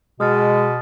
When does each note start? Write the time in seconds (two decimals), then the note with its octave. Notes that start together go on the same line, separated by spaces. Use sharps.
0.20 B2 G#3 D#6 F6 A6